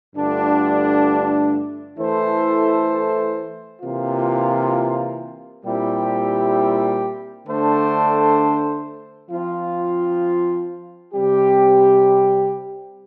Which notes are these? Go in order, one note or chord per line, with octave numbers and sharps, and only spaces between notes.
G2 D3 A3 D4 F4
E3 A3 E4 A4 C5
C3 E3 A#3 F4
A#2 G3 C4 E4 G4
D3 A3 D4 A4 C5
F3 C4 F4
C3 G3 C4 G4